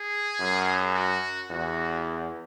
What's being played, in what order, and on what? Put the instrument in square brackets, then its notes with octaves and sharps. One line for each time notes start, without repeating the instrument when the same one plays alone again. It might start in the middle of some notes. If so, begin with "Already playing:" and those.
Already playing: [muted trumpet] G#4
[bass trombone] F#2
[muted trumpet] F#4
[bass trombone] E2 [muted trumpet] F#4